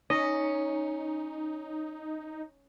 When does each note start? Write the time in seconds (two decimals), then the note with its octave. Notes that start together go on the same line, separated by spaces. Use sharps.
0.10 C#4 D#4 D#5